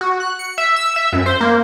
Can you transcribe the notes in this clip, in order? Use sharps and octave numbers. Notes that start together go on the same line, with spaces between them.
F#4
F#6
C#7
E5
E6
E5
F#2
C5
A#3